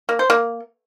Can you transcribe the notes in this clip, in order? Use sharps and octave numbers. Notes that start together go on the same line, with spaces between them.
A#3
C5
A#3